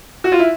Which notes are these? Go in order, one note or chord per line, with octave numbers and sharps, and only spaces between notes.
F#4
F4
E4